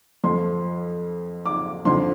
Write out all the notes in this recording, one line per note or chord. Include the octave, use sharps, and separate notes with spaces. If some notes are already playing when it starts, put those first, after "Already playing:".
F2 F3 C6
D6
F2 D3 F3 C6